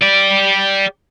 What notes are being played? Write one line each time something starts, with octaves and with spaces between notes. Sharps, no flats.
G4 D5